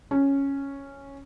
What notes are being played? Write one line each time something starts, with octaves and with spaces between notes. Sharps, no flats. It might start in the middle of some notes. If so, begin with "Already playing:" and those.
C#4